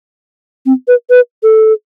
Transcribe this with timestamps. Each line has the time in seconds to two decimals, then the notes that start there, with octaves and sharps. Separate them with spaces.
0.66 C4
0.88 B4
1.10 B4
1.43 A4